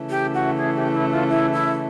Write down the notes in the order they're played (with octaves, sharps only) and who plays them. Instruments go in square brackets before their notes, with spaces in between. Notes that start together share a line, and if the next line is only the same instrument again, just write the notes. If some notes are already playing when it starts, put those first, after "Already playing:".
Already playing: [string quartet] C#3 E3 A3
[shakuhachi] G4
F#4
G#4
G4
E4
F4
E4
E4